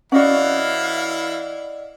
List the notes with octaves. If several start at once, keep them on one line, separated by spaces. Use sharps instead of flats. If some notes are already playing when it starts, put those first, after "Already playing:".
E3 C#4 E4 F#4 D5 D#5 F5 F#5